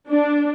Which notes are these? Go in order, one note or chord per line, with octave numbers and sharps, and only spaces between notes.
D4